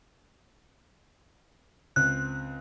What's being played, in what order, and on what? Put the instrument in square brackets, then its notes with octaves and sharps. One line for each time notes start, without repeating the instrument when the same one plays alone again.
[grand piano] C#2 C4 [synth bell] F#6